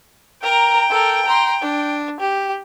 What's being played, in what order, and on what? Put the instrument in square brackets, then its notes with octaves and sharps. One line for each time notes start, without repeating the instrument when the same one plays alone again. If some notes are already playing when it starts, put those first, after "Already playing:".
[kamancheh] A#4 A#5 [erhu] G5
[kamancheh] A4 A#4
A#5 C6
D4
G4